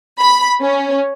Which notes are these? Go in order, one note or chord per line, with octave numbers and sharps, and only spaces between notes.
B5
C#4